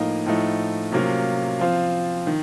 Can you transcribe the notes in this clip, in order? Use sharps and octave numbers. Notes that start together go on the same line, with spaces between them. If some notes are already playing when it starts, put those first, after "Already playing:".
Already playing: A2 F3 A#3 D#4
A2 F3 A3 D#4
C3 F#3 A#3 C#4 F4
F3 C4 F4
D#3